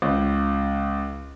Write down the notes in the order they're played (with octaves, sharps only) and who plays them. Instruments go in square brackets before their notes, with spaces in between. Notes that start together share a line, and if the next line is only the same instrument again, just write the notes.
[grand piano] C#2